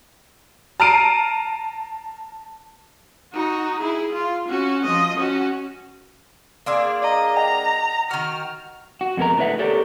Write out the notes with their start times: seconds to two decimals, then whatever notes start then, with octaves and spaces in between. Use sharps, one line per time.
0.80 A5 A#5 F6 C7 D7 D#7
3.33 D#4 F#4
3.79 E4 G#4
4.12 F4
4.48 C#4 F#4
4.85 F3 D#5
5.17 C#4 F#4
6.66 A#3 D4 G#4 F5 C6 E6
7.02 D5 D#5 F5 A#5
7.37 D#5 F#5 G5 A#5
8.11 D#3 F#4 F6
9.01 F#4
9.17 F2 B2 G#3 A#4 A#5
9.37 A2 D3 D4 B4 E5 F#5
9.59 G4 A4 A#4 C#5 D5